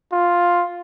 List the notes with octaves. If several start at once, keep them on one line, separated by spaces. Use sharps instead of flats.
F4